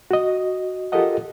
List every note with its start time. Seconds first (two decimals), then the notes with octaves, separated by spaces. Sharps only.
0.11 F#4 D#5
0.92 F4 G4 A4 A#4 D#5 F#5